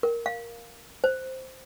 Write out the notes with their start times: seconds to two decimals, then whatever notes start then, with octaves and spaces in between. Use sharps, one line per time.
0.03 A#4
0.26 F5
1.04 C5